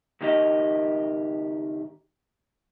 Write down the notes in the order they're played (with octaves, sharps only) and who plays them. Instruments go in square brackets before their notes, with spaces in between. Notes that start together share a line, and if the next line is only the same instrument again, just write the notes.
[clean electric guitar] C#2 G#2 D#3 G4 D#5